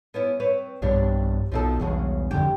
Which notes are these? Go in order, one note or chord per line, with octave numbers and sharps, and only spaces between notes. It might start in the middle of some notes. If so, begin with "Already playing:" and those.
B3 C#4 E4
C4 B4 C#5
B1 G2 G3 D4 G4 C#5
B1 B2 F3 C4 A4
E1 B1 E2 G2 C#3 G#3
G#1 F2 D3 G4